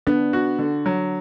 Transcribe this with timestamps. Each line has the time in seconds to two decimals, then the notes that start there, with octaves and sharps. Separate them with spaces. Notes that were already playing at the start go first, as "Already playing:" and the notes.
0.07 B3 D4
0.33 F#4
0.59 D3
0.86 F#3